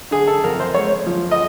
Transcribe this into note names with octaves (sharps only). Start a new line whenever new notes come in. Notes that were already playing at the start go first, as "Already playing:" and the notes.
D3 G#4
A4
F2 A#4
C5
G#3 C#5
F3
D#5